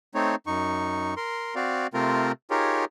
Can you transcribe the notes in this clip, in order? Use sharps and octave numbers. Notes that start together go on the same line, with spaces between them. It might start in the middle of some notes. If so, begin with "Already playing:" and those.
A3 C4 D#4 C#5
F#2 D#4 C#6
A#4 C6
C4 F#4 D5 F5
C3 A3 C4 F4 A#4
D#4 F4 G4 G#4 A#4 C#5